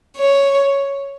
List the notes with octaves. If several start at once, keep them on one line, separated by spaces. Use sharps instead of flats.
C#5